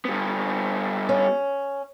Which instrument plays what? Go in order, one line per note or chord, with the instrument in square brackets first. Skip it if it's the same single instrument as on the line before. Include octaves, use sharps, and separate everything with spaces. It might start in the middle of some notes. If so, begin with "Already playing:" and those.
[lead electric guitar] G3 B3
[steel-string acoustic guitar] C#4